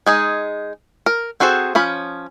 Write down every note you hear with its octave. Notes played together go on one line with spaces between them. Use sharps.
G#3 D#4 G#4
A#4
C4 F#4 G#4 A4 C5
F3 C#4 B5